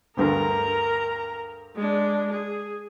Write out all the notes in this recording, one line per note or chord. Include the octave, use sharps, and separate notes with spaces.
D2 G2 D3 A#4 A#5
G#3 D4
G#4